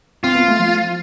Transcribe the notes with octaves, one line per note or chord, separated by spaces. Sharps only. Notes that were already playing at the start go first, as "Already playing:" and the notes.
C4 F4
B3
A3
F3